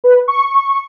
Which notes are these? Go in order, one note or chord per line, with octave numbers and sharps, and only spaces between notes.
B4
C#6